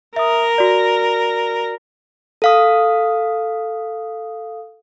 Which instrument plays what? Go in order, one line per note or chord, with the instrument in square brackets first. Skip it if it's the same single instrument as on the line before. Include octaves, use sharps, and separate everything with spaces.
[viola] A#4 [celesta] E5 D#6
[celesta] F#4 D5
[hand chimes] A4 F5 D#6